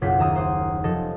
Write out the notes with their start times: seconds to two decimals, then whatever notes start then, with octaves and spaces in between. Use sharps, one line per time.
0.01 F#1 B1 F4 F#5 B6
0.19 D#2 E5 A#5 D#6 E6
0.36 C5 F#5 C6 D#6
0.84 F1 F3 A4 D#5 A#6